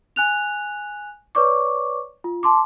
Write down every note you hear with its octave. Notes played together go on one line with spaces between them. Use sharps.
G#5 F#6 F7
B4 C#5 D5 C#6 D6
F4
A5 C6 D6